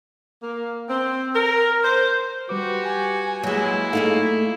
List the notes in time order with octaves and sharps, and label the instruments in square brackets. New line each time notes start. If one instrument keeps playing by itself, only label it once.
[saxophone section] A#3
C4
A#4
C5
[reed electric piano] G3 B4 D6 [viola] F#4 G4
[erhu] G#5
[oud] F#3 G#3 [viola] A#3 E4
[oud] A3 F4 G#4 [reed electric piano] D#4 A4 F5